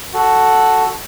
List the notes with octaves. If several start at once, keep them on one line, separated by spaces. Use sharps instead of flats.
F#4 A4